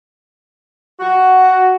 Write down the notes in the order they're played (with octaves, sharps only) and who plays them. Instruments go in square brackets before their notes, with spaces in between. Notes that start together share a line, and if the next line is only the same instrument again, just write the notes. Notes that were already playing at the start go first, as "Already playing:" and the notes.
[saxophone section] F#4